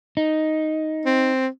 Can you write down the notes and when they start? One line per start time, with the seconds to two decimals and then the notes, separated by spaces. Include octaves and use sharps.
0.17 D#4
1.05 C4